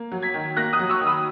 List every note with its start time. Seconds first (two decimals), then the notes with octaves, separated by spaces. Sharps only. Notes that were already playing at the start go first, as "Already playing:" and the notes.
Already playing: A#3
0.12 F#3
0.22 G#6 B6
0.34 D#3
0.57 A#3 F#6 A#6
0.73 D#6 F#6
0.79 F#3
0.89 C#6 E6
1.01 D#3
1.07 B5 D#6